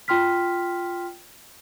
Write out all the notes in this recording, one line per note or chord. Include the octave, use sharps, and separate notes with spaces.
F4 G5 C6 F6 B6